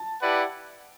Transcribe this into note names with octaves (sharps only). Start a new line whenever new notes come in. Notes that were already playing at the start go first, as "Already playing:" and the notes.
Already playing: A5
E4 G4 B4 D5 F#5